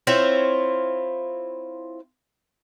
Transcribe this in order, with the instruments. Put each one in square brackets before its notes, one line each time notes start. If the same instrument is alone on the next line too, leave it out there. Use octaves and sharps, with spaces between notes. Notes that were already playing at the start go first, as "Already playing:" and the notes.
[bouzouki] C4 E4 F4 C#5